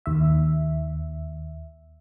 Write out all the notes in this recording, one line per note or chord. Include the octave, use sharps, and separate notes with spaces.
D#2 E5